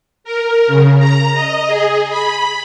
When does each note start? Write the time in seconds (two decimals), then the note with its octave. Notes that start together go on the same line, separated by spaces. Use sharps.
0.24 A#4
0.67 C#3
0.99 A#5
1.34 D#5
1.67 G#4
2.10 B5